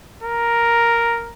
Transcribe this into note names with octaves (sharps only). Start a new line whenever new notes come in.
A#4